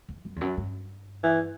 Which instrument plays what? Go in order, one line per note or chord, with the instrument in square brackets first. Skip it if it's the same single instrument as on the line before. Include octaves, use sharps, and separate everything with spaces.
[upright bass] E2
F#2
E2
F#2
G2
[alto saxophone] E3